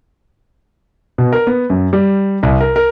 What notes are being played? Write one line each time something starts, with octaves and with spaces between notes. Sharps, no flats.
B2
A#4
B3
F#2
G3
C2
A#4
A#4